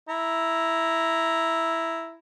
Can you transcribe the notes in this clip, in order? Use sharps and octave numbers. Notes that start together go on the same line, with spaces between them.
E4 A#5